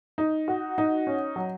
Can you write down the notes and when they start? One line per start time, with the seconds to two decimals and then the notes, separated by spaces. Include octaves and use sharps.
0.18 D#4
0.48 F#4
0.78 D#4
1.07 C#4
1.36 F#3